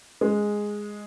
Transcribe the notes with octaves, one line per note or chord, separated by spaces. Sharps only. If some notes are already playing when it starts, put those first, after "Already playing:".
G#3